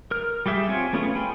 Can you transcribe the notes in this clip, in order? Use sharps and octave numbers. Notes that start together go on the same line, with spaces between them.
A#4 F6
G3 G4 G#4 E5
C4 F4 C#5 G#5
A3 B3 C#4 F4 G#4
G5 G#5 B5 C6